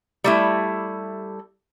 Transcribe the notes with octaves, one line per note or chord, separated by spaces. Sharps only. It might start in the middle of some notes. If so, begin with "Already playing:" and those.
G3 A3 E4